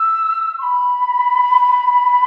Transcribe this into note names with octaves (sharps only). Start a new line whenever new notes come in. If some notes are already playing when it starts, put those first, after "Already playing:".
Already playing: E6
C#6
B5